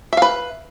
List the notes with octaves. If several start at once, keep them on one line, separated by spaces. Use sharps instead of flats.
B4 E5 F5